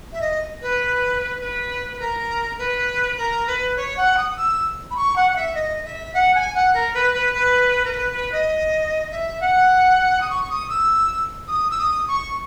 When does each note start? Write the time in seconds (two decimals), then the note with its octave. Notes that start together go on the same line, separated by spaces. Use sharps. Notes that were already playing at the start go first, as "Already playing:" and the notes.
0.12 E5
0.21 D#5
0.61 B4
1.40 B4
1.91 B4
1.99 A#4
2.58 B4
3.17 A#4
3.47 B4
3.76 C#5
3.97 F#5
4.17 D#6
4.36 E6
4.90 B5
4.96 C#6
5.15 F#5
5.31 F#5
5.35 E5
5.54 D#5
5.84 E5
6.14 F#5
6.34 G#5
6.54 F#5
6.73 A#4
6.94 B4
7.13 B4
7.33 B4
7.84 A#4
7.92 B4
8.11 B4
8.31 D#5
9.11 E5
9.40 F#5
10.20 D#6
10.30 C#6
10.42 C#6
10.49 D#6
10.69 E6
11.47 D#6
11.70 E6
11.78 D#6
12.07 C#6